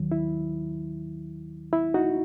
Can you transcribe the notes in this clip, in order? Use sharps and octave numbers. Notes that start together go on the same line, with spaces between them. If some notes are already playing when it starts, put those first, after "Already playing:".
Already playing: D#2 D#3 F#3
E4
E4
D#4 F#4